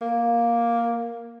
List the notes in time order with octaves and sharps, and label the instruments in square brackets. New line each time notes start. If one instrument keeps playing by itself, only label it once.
[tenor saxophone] A#3